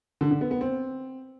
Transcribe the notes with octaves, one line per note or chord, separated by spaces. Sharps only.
D3
D3
B3
B3
C4